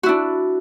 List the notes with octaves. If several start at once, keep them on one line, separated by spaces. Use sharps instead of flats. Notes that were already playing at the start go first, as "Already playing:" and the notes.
D4 E4 F#4